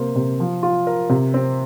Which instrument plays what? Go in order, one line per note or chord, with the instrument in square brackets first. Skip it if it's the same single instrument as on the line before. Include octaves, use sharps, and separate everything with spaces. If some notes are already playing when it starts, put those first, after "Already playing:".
Already playing: [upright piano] C3 A#3 C5
C3
F3
F4
A#4
C3
C4